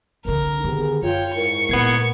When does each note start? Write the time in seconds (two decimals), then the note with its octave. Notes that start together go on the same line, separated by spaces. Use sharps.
0.25 C2 D3 A#4
0.64 D3 D#3 B3 G4 G#4
1.02 F#2 F4 C#5 G5
1.34 G#2 E4 A#4 C#6
1.69 A#2 A3 B3 G#6 C7